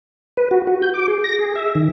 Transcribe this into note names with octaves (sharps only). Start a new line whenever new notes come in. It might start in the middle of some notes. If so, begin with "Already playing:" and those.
B4
F#4
F#4
G6
D6
G#4
A#6
G#4
E5
D#3